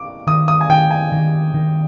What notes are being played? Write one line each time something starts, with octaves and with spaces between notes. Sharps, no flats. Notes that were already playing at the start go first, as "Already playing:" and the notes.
Already playing: D6
D#3 D#6
D#6
G#5
D#3 G5
G#5
D#3
D#3